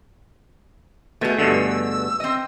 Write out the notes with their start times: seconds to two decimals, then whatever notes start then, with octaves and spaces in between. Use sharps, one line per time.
1.21 B2 A3 G#4
1.38 G2 B2 D3 E6
2.20 C4 D#5